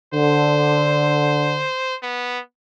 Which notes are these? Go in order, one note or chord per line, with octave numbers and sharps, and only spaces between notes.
D3 C5
B3